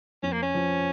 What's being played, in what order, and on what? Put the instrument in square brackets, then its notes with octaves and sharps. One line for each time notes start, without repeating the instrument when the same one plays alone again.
[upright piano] F2 [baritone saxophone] C#4
[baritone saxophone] A#3
C#4
[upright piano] F3